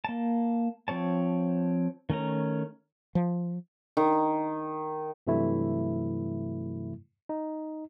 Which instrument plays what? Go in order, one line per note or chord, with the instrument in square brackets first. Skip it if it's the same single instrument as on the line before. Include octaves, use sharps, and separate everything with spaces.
[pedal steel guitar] A#3 A5
F3 C4 C#5 A5
D#3 A3 C#4 A#5
[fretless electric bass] F3
[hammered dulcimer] D#3
[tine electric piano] G2 C3 E3 F#3 A3 E4
D#4